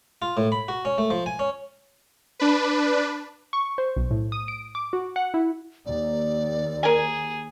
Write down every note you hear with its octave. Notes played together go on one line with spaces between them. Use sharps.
F4
A2
B5
F#4
C#4
A3
F3
G#5
C#4
D4 B4
C#6
C5
B1
A2
D#6
D7
D6
F#4
F#5
E4
D#2 D5
G#4 A#4 G#5